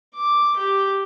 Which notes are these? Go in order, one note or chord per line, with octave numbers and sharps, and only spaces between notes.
D6
G4